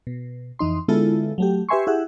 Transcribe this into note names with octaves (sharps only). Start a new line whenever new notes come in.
B2
F2 E3 D#4 C6
D3 G#3 B3 E4 F4 A4
F#3 A3 G4
G4 B4 E5 G#5 C6 C#6
E4 G4 G#4 E5 F#5